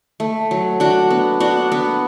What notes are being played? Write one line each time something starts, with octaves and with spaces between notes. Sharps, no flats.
A3
F#3
D4 F#4
B3
D4 F#4
B3